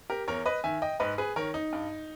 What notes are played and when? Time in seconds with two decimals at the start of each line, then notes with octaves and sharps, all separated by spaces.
0.10 G4 A#4
0.28 E2 A#4 C#5
0.46 B4 D#5
0.64 D#3 E5 G#5
0.82 D#5 G5
1.00 G#2 B4 D#5
1.18 G#4 B4
1.36 D#3 A#4 C#5
1.54 D#4
1.73 G2